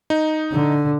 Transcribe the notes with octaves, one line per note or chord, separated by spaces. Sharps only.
D#4
D3